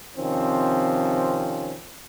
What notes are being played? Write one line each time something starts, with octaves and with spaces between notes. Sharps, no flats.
C3 D#3 F3 C4 C#4